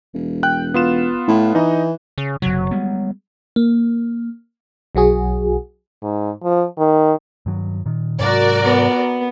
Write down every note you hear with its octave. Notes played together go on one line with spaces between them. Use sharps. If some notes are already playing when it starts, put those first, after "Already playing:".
E1
G5 F#6
B3 F4 E7
A2
E3 D#4 D#5
C#3
F#1 C3 F#3
G3 G#3 B3
A#3
B1 F#3 F#4 G#4
G#2
F3
D#3
G2 D#3 F#3
A#2 D#3
G#2 C3 F#3 F#4 A#4 D5
B3